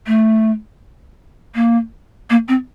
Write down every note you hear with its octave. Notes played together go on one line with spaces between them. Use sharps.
A3
A#3
A#3
C4